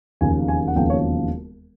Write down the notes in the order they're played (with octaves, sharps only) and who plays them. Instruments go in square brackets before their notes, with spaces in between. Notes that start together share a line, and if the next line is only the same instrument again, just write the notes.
[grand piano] E1 D#2 C#3 F3 A#3 G#5
G#5
F#5
E1 D#2 C#3 F3 A#3 G5
C#5